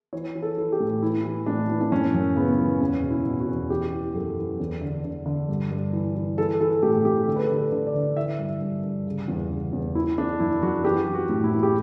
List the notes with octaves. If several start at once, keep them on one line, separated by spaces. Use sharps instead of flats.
E3 C#5
E3
A4
E3
G4
A2
E3 E4
E3
A2 D4
E3
D4
F#2 C#4
F#2
C#3 B3
E3
E2 C#4
B2
E4
B2
F#4
E2
E3 G4
E3
F#2 A4
E3
E2
D3
D3
D3
G2
G2
E3
E3
E3 A4
E3 A4
A2 G4
A2 G4
D3 A4
B4
A4
D3
B4
D3
D5
D3
E3 E5
G2 E5
G2
G2
C#3
E2
C#3
E2
E3 E4
E3 D4
F#2 E4
F#2 F#4
E3 G4
E3
F#4
A2
E4
E3
G4